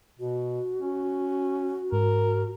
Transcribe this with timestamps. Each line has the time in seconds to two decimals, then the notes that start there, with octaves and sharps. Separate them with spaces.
0.20 B2 F#4
0.81 C#4
1.92 G#2 A#4